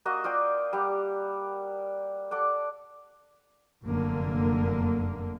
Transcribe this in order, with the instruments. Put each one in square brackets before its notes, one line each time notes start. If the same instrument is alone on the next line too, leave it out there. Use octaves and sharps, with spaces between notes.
[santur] A#3 F#4 D#5
F4 D5 G5 D#6
G3 F#5
A4 D5 F#5
[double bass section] F1 F#2 D3 A#3